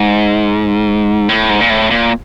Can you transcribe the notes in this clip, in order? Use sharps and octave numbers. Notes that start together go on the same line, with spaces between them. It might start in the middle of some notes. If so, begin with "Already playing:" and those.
Already playing: G#2
A2
G#2
A#2
A2
A#2